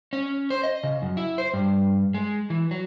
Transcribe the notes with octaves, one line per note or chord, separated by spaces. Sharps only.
C#4
C5
D#5
C#3
F#2
E4
C5
G2
G#3
E3
F#3